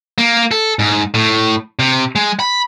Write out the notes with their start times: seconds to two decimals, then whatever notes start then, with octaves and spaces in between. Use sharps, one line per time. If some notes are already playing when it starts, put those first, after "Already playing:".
0.18 A#3
0.51 A4
0.79 G#2
1.14 A2
1.79 C3
2.16 G#3
2.40 B5